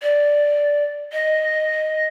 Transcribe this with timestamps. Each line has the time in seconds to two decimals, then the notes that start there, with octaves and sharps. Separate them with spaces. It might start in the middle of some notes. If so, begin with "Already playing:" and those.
0.02 D5
1.13 D#5